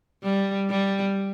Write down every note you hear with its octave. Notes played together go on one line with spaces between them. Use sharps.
G3
G3